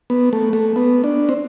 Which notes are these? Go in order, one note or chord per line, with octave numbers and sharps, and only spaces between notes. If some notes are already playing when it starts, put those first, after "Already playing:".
B3
A3
A3
B3
D4
C4